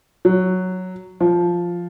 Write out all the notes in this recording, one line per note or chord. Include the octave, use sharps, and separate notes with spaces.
F#3
F3